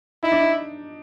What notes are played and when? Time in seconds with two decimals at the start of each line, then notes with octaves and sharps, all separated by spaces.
0.23 D#4 E4
0.32 D4
0.41 D#4